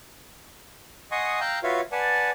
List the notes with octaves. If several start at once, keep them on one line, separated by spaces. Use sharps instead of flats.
D#5 F#5 G#5 C6 C#6 D#6
F5 G5 A#5 E6 F#6 G6
F4 F#4 B4 C#5 E5 F5
B4 D5 F#5 G#5 A5